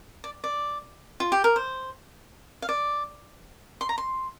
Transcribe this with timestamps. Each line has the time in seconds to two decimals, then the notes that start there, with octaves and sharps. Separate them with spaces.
0.24 D5
0.44 D5
1.20 F4
1.32 G4
1.44 A#4
1.56 C5
2.62 F5
2.69 D5
3.81 C6
3.89 A#5
3.98 C6